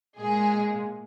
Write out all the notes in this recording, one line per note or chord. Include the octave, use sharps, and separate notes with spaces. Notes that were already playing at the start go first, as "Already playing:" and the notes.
A#2 G#3 G#4